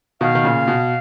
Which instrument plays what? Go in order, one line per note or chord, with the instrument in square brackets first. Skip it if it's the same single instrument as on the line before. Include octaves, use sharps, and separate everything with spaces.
[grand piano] B2 D#3 [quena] F5
[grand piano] D#3
A#2 C#3
B2